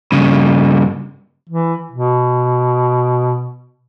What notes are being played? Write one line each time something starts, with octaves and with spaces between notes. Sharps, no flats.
G2 C#3
E3
B2